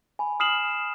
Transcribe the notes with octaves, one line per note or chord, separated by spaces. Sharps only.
G#5 B5
D#6 F6 C7 E7 F#7